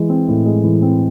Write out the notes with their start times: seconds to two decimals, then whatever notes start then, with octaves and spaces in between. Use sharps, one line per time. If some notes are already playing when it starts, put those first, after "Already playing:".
Already playing: E3 G#3
0.09 C4
0.28 A2
0.45 G#3
0.64 E3
0.82 C4